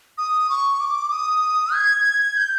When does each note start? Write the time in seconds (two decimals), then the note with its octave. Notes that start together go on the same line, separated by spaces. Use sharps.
0.18 D#6
0.50 C#6
0.80 D6
1.12 D#6
1.74 G#6
2.37 G6